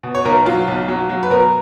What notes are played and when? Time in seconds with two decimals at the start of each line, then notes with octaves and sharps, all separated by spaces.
0.03 B2
0.15 C#5
0.25 B1 A#4
0.46 F#3 F4
0.68 B1
0.88 F#3
1.09 F#3
1.23 B4
1.30 B2 A#4